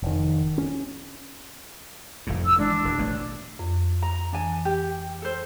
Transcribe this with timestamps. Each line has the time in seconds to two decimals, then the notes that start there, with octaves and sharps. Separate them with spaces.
0.03 F1 D#3
0.58 C#4
2.27 F1 F2 A2
2.46 E6
2.58 E3 G#3 D4
2.84 E1 D2
2.98 A1 B2 A3
3.59 F2
4.02 A#5
4.33 E3 D4 G#5
4.65 G4
5.22 A4 C5